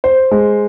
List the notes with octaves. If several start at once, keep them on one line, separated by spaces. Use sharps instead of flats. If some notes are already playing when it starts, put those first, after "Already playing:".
C5
G#3